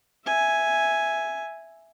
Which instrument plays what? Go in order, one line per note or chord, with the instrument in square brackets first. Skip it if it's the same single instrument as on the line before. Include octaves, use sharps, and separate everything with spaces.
[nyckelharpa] E5 G#5